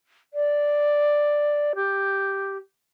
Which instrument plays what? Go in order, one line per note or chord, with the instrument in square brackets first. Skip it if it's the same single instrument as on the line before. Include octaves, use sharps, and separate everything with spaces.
[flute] D5
G4